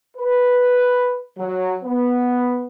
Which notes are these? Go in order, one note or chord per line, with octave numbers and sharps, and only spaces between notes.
B4
F#3
B3